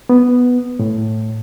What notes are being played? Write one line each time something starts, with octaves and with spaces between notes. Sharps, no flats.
B3
A2